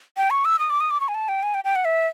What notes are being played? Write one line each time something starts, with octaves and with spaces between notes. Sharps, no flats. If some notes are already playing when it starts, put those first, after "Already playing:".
G5
C#6
E6
D#6
D6
D#6
D6
C#6
G#5
A5
G5
G#5
G5
G5
F#5
E5